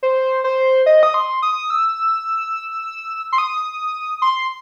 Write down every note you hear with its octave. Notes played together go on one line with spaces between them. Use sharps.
C5
C5
D#5
D#6
C6
D#6
E6
C6
D#6
C6